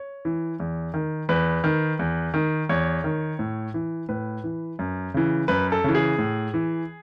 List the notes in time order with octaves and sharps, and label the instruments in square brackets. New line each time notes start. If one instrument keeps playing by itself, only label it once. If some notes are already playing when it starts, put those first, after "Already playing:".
Already playing: [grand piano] C#5
E3
E2
D#3
E2 B4
D#3
E2
D#3
E2 C#5
D#3
A2
E3
A2 B4
E3
F#2
C#3 E3
F#2 B4
A4
C#3 E3
G#4
A2
E3